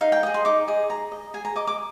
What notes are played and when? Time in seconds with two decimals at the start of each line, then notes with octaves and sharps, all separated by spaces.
0.01 D#4 F5
0.12 G5
0.23 G#4 D#5
0.34 C6
0.45 D#4 D6
0.68 G#4 D#5
0.90 G#4 A#5
1.12 D#5
1.34 G#4 G#5
1.45 A#5
1.56 D#5 D6
1.67 D6